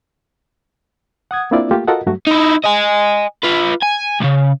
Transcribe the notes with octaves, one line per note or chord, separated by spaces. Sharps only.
F#5 D#6 G#6
A#3 C4 D4 E4 F4 D5
A3 A#3 F4 G4
F4 F#4 A4 A#4 D#5 F#5
G2 F#3 A3 F#4
D#4 E4
D#5 G#5
F4 B4
G#5
C#2 C#3